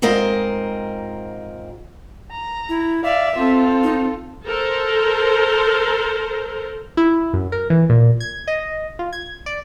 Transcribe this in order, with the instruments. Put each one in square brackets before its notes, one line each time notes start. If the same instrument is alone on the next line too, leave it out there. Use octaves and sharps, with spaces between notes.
[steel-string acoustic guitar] G#2 C4 F4 A#4 D#5
[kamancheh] A#5
[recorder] E4
[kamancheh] D5 F5 [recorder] E5
[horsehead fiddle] C4 [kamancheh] F4 A4
[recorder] D#4
[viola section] A4 A#4 C5
[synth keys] E4
F#2
A#4
E3
A#2
G#6
D#5
F4
G#6
D5